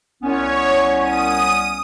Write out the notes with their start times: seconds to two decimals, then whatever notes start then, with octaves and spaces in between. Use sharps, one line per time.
0.23 C2 B3 C#4 C#5
0.98 D#6 D#7